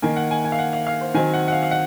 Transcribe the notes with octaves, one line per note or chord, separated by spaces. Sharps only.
D#3 A#3 G#5
F#5
G#5
G#5
F5
F#5
F5
F5
C5
D#3 F#3 C4 G#5
F#5
F#5
F5
F5
F#5